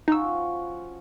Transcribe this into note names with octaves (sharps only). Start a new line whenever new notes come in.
F3 C#4 D#4 F#4 E6